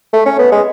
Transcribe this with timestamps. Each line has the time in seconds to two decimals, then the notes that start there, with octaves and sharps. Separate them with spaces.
0.13 A3
0.25 C#4
0.39 B3
0.52 G#3